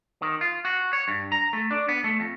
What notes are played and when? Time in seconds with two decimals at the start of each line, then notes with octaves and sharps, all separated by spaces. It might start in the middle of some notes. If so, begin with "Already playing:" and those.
0.22 D#3
0.41 F4
0.65 F#4
0.93 C#5
1.08 G2
1.32 A#5
1.53 A3
1.71 D4
1.89 B3
2.04 A3
2.20 F2